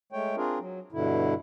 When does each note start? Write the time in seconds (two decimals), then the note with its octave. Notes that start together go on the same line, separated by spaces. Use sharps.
0.12 G#3 A3 C#5 G5
0.36 C4 D4 F4 G#4 A#4
0.59 F#3
0.92 G2 B2 D3 E4